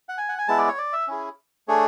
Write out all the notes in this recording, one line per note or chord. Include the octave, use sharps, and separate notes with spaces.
F#5
G#5
F#5
G#5
G#3 B3 E4 A5
D5
C#5
D5
E5
C#4 E4 G#4
A3 D4 G#4 C#5